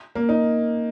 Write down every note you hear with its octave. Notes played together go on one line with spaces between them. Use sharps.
A#3
D#4